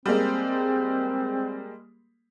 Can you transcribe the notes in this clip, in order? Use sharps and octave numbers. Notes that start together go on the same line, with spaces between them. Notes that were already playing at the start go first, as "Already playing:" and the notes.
G3 G#3 A#3 C4